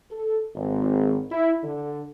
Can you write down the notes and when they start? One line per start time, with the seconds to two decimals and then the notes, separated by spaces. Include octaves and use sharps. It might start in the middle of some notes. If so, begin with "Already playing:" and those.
0.11 A4
0.55 G#1
1.31 E4
1.63 D3